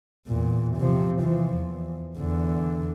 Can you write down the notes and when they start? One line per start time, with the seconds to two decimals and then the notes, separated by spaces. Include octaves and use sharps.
0.27 E2 A#2
0.77 C3 F3
1.22 E3 F3
1.54 E2
2.18 E2 D3